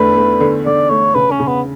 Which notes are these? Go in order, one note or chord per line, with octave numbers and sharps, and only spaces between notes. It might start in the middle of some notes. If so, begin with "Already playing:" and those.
Already playing: E2 D3 A3 D4 B4
A3
D3
D3 D5
A3 C#5
C#3 B4
C#4
C#3
B3